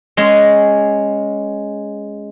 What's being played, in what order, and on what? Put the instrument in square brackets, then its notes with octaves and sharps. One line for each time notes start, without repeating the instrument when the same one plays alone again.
[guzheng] G#3 C#4 G#4